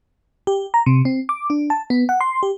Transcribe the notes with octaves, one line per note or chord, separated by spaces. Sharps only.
G4
A#5
C3
C4
D6
D4
A5
B3
F#5
C6
G4